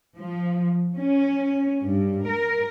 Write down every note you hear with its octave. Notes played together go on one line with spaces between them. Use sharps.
F3
C#4
G2
A#4